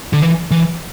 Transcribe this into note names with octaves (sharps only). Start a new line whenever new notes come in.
D3
E3
E3